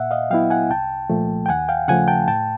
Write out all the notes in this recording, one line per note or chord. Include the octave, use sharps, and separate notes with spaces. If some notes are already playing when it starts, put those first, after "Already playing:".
Already playing: A#2 E5 F#5
D#5 F5
F#3 B3 E4 F5 G5
F#5 G#5
C2 G5 A5
A#2 F3 A3
G5
D#2 F#5 G#5
F5 G5
C#3 F3 A3 F#5 G#5
G5 A5
A2 G5 A5